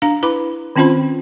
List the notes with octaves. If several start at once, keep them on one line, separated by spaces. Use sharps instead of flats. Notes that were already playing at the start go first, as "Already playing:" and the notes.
D4 F5 A#5
E4 B4 B5 D6
D#3 C4 C#4 F4 C5 B5